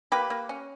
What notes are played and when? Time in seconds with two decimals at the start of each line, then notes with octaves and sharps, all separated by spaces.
0.12 A#3 G4 B4
0.30 A#3
0.49 C#4